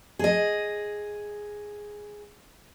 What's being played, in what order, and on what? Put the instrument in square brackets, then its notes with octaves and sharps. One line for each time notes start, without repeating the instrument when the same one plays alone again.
[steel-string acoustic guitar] G#4 D#5